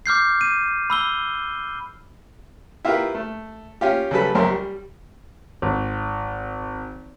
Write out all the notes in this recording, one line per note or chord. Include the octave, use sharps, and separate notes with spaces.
D6 F6 G6 C7
D#7
B5 E6 G7
E4 F4 G4 A#4 B4
A3
C#4 F4 G4
C#3 F#3 G3 A4 B4
C#2 F#2 A#4 C5
G3
G#1